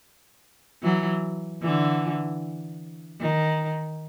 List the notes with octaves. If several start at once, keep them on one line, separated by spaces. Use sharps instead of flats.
E3 F#3
D3 E3
D#3